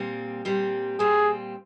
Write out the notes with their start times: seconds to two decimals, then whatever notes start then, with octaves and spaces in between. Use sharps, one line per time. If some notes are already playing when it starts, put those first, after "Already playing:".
Already playing: A#2 G3 C4
0.45 A#2 G3 C4
0.99 A#2 G3 C4 G#4